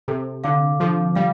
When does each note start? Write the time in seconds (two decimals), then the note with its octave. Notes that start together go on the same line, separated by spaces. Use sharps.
0.08 C3 A4
0.44 D3 F5 D6
0.80 F3 A4
1.16 G3 F5